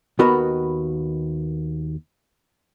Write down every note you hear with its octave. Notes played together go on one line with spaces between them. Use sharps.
D#2 B3 F#4 A#4 B4 D#5